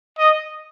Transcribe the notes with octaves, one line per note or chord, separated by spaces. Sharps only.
D#5